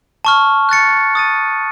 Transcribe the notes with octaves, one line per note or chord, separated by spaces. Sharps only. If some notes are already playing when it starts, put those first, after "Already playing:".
A5 C#6 F6
F#6 A6 C#7
D#6 A6 D#7